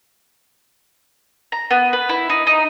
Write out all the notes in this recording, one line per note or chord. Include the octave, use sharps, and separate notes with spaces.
A#5
B3
B4
E4
D#4
D#4